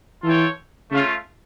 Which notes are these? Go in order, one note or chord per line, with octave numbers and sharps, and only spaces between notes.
E3 F4 A4 C#5 G5
C#3 A3 C#4 F4 C#5